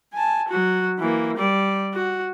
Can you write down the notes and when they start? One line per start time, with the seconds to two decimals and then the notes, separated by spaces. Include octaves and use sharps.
0.14 G#5 A5
0.49 F#3 F#4
0.99 E3 A#3
1.37 G3 D5
1.94 F#4